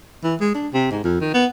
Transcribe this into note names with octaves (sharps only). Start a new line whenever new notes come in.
E3
G#3
D4
C3
G#2
F2
D#3
B3